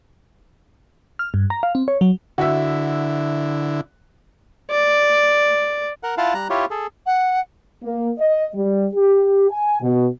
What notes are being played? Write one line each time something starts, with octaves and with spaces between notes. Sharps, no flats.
F6
G2
A#5
F5
C4
C#5
F#3
D3 E4 F#4 E5
D5
A#4 F#5
E4 F4 F5 F#5 A5
G3 A#5 F#6
E4 F4 G4 C#5
G#4 A4
F#5
A#3
D#5
G3
G4
G#5
B2